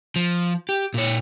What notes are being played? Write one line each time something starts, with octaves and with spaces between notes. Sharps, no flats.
F3
G4
A#2 C#5